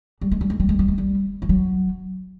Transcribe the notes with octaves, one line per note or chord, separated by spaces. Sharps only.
G3
G#3
G3
G#3
G3
G#3
G3
G#3
G3
F3
F#3